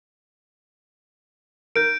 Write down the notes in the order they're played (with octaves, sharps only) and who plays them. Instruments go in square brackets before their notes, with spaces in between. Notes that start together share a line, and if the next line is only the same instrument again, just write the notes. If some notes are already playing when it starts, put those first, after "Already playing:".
[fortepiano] A#4 [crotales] G6 D7